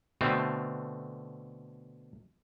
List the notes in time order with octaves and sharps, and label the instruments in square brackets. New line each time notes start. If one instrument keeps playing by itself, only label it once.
[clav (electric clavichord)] B2 D3 A3 C4